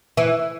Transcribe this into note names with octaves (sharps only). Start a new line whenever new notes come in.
E3